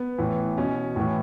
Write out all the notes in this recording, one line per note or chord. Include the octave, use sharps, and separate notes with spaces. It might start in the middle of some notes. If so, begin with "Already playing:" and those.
Already playing: B3
A2 E3
B2 C#4
A2 E3